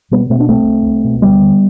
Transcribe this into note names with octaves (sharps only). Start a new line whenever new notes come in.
B2 G3 B3
B2 A3 C4
B3 D4
C2 A3 C4
C2
C2
B2
D2 G3 B3
D3